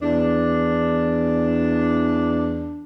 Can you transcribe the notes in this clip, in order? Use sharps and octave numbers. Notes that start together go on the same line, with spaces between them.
E2 D4